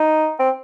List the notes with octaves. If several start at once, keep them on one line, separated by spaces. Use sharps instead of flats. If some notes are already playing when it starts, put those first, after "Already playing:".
Already playing: D#4
C4